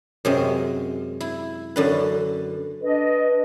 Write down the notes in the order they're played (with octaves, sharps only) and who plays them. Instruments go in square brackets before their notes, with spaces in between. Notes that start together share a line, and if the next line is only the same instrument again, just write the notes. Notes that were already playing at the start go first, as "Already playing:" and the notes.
[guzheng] F#2 C3 G#3
E4
F#2 D3 B4
[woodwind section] D4 D#5 [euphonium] B4